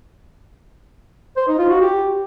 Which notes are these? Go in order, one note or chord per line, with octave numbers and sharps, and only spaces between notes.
C5
D#4
F4
F#4
G4